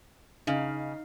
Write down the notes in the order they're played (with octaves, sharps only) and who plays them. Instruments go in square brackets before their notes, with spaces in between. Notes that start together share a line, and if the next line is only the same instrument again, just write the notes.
[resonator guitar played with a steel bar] C#3 [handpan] D#4 F5